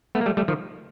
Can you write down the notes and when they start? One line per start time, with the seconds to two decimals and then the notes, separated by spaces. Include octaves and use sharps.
0.15 A3 B3
0.21 A#3
0.26 G3 A3
0.37 G3 A3
0.48 D#3 F3